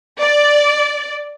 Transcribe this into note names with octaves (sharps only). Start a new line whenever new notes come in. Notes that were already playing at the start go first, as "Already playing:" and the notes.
D5